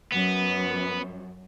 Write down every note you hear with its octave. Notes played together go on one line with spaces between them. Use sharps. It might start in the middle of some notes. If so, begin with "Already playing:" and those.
F#2 B3